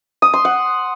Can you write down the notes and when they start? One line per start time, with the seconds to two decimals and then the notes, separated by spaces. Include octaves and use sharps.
0.22 D#6
0.33 C6
0.45 F#5